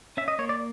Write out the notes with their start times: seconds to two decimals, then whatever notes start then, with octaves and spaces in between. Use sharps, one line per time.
0.17 C#4 E5
0.28 D#5
0.39 A#3 C#5
0.49 D5